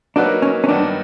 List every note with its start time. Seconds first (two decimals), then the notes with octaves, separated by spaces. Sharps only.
0.16 F#3 A#3 D4 D#4 F#4 B4
0.42 C#4
0.64 C#4
0.68 G2 D#3 F#3 B3 D4